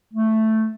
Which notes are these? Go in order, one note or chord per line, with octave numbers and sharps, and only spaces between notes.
A3